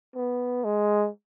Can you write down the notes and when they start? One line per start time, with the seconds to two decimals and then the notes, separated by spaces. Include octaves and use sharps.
0.15 B3
0.64 G#3